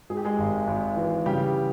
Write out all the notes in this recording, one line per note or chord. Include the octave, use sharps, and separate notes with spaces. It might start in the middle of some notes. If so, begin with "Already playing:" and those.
G#2 G#4
G4
G#3 G#4
G#1
G#1
E3
C#3 G3 G4